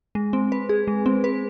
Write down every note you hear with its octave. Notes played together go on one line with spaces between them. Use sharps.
G#3
C4
B4
G#4
G#3
C4
B4